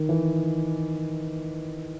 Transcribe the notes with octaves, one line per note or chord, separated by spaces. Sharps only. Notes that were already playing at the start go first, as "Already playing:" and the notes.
Already playing: D#3
E3